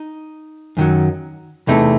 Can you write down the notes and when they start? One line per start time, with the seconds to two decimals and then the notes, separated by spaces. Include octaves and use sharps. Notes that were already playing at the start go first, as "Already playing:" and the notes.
Already playing: D#4
0.77 F#2 D#3 F#3
1.67 E2 C3 E3 A3 D#4